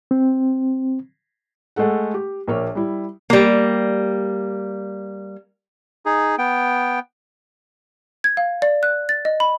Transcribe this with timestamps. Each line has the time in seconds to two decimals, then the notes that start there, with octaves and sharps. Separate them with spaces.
0.11 C4
1.76 G#3 A3 A4 F#5
2.14 G4
2.47 A#1 A#3 C#5
2.75 G3 E4
3.30 G3 A#3
6.06 D#4 G#4
6.38 B3 G5
8.24 G#6
8.37 F5
8.62 D5
8.83 F#6
9.09 A6
9.25 D#5
9.40 B5